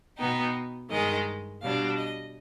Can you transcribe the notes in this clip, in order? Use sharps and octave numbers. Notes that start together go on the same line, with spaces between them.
B2 B3 D#4 G5
G2 D#3 G#3 D#5
B2 G3 D4 F5
D#5